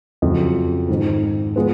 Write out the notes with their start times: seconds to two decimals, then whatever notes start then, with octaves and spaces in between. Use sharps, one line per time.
0.22 F2 C#3 F#3
0.89 G#2 D#3 G#3 C4
1.56 F3 G#3 B3